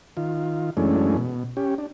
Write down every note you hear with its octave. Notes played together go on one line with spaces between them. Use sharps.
D#3 F4
F#2 E3 G#3 A3 C#4 D4
B2
C#4 G4
D4